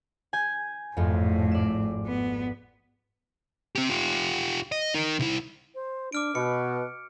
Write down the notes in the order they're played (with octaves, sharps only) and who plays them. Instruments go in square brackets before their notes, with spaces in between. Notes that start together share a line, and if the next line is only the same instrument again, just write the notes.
[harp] G#5 G6 G#6
[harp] G#1 F2 [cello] A2
[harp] D5 E7
[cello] B3
[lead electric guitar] C4 G4
F4 G4
D#5
D#4 A#4
C2 E4
[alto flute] C5
[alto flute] D4 [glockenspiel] D6 F6 D7
[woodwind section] B2 [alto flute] B4 [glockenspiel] C#7